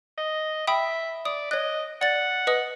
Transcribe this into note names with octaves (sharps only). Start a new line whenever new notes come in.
D#5
E5 G5 B5 D#6
D5 D#6
C#5 D#5 F#6
D5 F#5 A6
B4 D#5 D#6